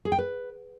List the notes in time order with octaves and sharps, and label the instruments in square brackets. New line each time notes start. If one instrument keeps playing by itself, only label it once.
[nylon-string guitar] G#4
G5
B4